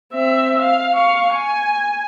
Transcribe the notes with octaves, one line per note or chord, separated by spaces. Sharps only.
C4 E5
F5
F5 C#6
G#5